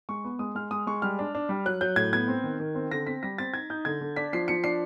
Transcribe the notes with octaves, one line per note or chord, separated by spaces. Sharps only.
G#3 C#6
B3
G#3 D#6
G#3 F6
G#3 D#6
G#3 C#6
G3 F6
D4
D4
G3
F#3 F#6
F#3 G6
A2 G#6
B3 G#6
C4
D#3
D#3
C4
D3 A#6
C4 B6
G3 A#6
C4 A6
D#4 G#6
D#4 G6
D3 G#6
D3
D4 B6
F3 C7
F3 C#7
D4 C7